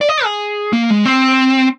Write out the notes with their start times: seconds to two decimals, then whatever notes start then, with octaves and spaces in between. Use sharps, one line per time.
0.01 D5
0.09 D#5
0.24 G#4
0.73 A#3
0.90 G#3
1.06 C4